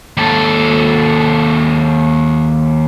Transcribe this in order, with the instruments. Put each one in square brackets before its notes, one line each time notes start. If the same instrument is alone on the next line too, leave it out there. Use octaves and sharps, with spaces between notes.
[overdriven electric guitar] D#2 A4